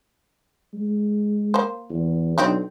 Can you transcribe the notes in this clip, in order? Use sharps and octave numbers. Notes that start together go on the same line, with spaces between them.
G#3
A#3 C5
E2
B1 C4 D4 D#4